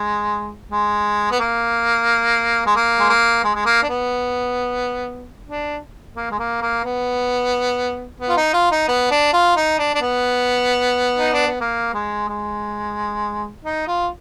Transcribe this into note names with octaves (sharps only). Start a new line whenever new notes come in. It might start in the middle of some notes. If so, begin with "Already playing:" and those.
Already playing: G#3
G#3
B3
A#3
G#3
A#3
G#3
A#3
G#3
G#3
A#3
D4
B3
D4
A#3
G#3
A#3
A#3
B3
B3
F4
D#4
F4
D#4
B3
D4
F4
D#4
D4
D4
B3
D#4
D4
B3
A#3
G#3
G#3
D#4
F4